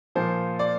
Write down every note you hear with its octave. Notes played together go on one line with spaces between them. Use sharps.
A#2 F3 C5
D5